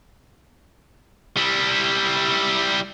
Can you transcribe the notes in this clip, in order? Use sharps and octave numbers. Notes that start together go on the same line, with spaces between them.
G3 E4